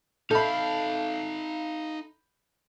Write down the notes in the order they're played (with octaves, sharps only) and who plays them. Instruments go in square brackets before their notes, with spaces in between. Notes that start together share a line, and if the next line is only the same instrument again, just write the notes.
[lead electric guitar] D#4 A5 [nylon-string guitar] A4 E5 [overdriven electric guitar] F5 [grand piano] B5 G6